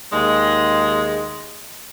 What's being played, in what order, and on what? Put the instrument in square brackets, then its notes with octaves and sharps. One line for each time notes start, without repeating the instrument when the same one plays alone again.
[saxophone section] D#2 G#3